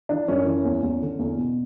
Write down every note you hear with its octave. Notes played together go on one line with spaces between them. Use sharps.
E3 D4
F#2 C#4
E3 C#4
E2
E2
D3
E2
B2